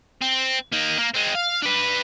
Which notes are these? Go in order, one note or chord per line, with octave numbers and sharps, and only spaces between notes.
C4
A#3 D#4
A#3
G#3 C4
F5
D4 B4